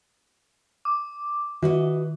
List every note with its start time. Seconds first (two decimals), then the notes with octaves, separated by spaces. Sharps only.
0.85 D6
1.62 D#3 F#4 B4 D#5